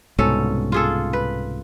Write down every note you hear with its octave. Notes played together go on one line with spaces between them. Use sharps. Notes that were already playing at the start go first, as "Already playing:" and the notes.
C2 G#2 B2 C#4 A4
F4 G#4 A4
B4